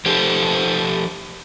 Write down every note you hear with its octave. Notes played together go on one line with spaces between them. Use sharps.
F3 G4 A4 C5